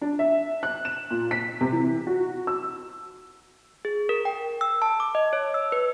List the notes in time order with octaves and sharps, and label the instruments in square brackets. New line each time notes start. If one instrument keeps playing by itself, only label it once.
[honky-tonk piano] D4
E5
F#6
E7
A#2
B6
C3
E3
F#4
E6
[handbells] G#4
A#4
G5
E6
A5
D6
D#5
C#5
E6
B4